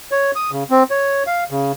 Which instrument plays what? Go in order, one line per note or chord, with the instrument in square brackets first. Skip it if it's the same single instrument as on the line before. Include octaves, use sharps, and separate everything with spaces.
[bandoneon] C#5
D#6
C#3
C4
C#5
F5
C#3